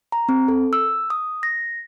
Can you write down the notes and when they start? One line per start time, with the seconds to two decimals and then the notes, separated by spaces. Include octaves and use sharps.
0.12 A#5
0.29 C4
0.48 A4
0.73 E6
1.10 D#6
1.43 A#6